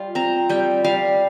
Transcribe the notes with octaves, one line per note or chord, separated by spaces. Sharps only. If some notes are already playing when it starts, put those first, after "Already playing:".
Already playing: G3 F4
C4 A#5
G3 G5
G3 F5